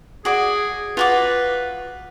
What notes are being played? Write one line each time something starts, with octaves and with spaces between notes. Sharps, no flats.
F#4 G#4 D5
F4 F#4 B4 D6